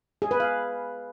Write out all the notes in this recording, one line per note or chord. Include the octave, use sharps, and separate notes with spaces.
G#4
B4
F5